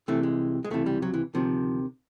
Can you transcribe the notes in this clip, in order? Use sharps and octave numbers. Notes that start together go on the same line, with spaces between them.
C2 C3 E3 A3
G#3
G#3
C#2 C3 E3 A3
G3
F#3
E3
D2 C3 D#3 F3